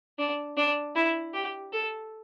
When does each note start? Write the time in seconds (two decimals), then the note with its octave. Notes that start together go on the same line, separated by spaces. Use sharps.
0.18 D4
0.57 D4
0.96 E4
1.34 G4
1.73 A4